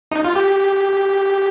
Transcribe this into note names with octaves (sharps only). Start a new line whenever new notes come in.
D#4
F4
G4